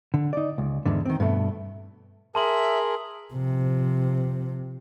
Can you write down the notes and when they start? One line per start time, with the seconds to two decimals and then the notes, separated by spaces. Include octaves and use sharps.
0.14 D3
0.33 D#4 D5
0.58 C#2
0.86 E2 G#2 D3
1.05 D#3 C4
1.20 G2 B2 A3
2.35 G#4 A#4 E5 A5 C6 F#7
3.33 C3 F3